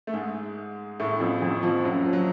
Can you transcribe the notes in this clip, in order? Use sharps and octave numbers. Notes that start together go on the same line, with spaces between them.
A3
G#2 G#3
A2 A3
F2 F3
F2 F3
F2 F3
F#2 F#3
F3
F#3